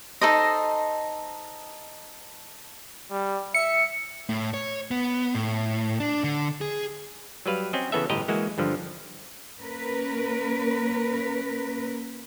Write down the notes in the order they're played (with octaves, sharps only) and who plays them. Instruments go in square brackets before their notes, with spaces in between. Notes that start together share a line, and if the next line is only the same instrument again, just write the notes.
[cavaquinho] D#4 A4 C5 D#5
[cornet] G3
[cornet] E5 [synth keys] C#7
[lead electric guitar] A2
C#5
B3
A2
D4
D3
G#4
[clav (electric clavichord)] F#3 G3 B4 F5
C4 C#4 F#4 D#5
C#3 E3 B3 A4 E5
G1 A2 G4 D#5 A#5
E3 G#3 A#3 F#4
G2 D3 F3
[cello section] A#3 C#4 A#4 B4